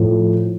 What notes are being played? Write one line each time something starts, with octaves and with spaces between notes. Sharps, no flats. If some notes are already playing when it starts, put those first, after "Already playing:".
Already playing: A2 F3 A3